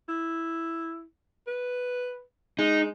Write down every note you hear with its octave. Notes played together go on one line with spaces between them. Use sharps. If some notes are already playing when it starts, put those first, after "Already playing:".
E4
B4
G#3 D#4